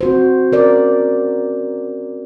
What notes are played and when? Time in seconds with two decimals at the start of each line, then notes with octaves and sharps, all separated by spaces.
0.01 C4 F#4 C5
0.52 C#4 A#4 D5